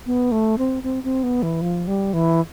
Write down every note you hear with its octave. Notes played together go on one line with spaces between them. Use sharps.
B3
A3
C4
C4
C4
B3
E3
F3
G3
E3